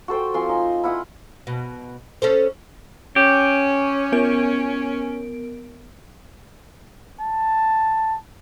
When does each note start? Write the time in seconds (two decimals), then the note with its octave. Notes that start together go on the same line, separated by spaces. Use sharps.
0.08 F#4 A4 C5 G5
0.34 F3 C4 G#5 C6
0.49 D#4 D#5 G#5
0.84 E4 F4 F#5 D#6
1.47 B2
2.22 C#4 A4 C5
3.16 C#4 G4
4.12 B3 A#4 D7
7.20 A5